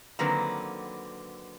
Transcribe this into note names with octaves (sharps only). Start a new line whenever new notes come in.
D3 D#3 F#3 A#3 C4 B4